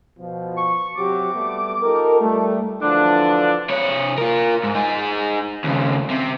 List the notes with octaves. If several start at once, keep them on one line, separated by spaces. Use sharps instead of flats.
B2 F3
C#6
C3 F#3 G4 D6
G3 A3 B3
D#4 F4 G4 A4 A#4
G3 A3
D3 E3 F3 D4
C3 C#5
F4 A#4
G#2
D#4 G#4
D#2 C#3
C3